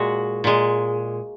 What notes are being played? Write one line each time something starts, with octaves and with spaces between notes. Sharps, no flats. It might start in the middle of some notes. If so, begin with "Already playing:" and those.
Already playing: A#2 G#3 F#4
A#2 G#3